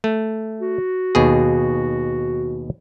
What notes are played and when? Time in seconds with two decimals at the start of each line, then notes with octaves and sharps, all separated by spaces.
0.04 A3
0.61 F#4
1.15 D#2 B2 G#4